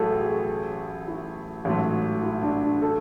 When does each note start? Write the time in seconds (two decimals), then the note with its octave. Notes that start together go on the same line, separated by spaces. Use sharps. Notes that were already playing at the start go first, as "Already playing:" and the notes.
Already playing: A1 A2 F#3 A3 F#4 G#4 A4
0.20 G#4
1.08 E4
1.65 A1 G#2 F#3 A3
2.23 E4
2.43 D4
2.63 D4
2.82 A4